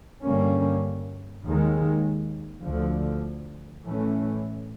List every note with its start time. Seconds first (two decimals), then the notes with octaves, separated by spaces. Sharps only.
0.24 G2 D3 G3 A#3 C#4
1.45 D#2 D#3 G#3
2.64 D2 D3 F3
3.85 A2 E3 A3 C#4